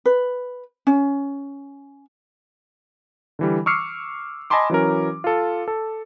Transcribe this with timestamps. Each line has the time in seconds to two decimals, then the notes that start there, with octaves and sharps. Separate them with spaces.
0.06 B4
0.87 C#4
3.39 D3 E3 G3
3.66 C#6 D6 E6 F6 C7 C#7
4.50 D#5 G#5 A5 B5 C6 D6
4.70 E3 F#3 C#4 A#4
5.24 F4 A4
5.68 A4